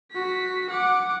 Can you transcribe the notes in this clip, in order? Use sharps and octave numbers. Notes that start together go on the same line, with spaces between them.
F#4 B6
F#5 D6